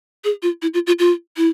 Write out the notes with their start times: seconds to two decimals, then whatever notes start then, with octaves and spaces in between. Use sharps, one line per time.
0.24 G#4
0.42 F4
0.62 E4
0.74 F4
0.87 F4
0.99 F4
1.37 E4